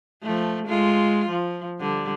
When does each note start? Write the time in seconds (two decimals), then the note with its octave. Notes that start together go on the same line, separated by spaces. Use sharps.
0.23 F3 A3
0.66 G#3 F4
1.29 F3
1.80 D3 G3